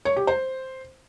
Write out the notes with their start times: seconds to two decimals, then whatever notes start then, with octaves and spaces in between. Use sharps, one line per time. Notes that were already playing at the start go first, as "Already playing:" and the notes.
0.05 C#5
0.16 G4
0.27 C5